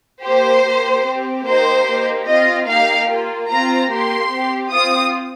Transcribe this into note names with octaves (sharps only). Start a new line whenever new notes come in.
A#3 G4 C5
A#3 G4
C4 G4
A#3 D#4 G4 C5
A#3 D#4 G4
C4 F4 D#5
A#3 D#4 G4 F5
A#3 F4
C4 F4 A#5
A#3 G4 C6
C4 G4
C4 F4 D#6